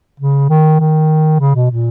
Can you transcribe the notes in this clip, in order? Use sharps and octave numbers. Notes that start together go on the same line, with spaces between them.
C#3
D#3
D#3
C#3
B2
A#2